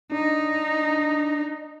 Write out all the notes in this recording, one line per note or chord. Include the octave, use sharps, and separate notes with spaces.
D4 D#4